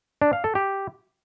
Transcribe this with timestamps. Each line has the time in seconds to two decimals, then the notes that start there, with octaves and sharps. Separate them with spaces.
0.22 D4
0.33 F5
0.44 A4
0.55 G4